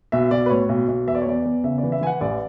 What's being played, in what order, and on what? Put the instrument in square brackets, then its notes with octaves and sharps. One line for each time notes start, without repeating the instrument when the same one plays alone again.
[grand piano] B1 E5
B1 D5
B4
A2 C#5
B1
B1
E2 E5
D5
C#5
E2 D5
E2
C#3 E5
D5
E3
E5
E3 G#5
F#5
A1 D5